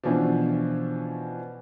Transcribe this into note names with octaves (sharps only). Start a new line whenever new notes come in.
B2 E3 F3 C#4 D4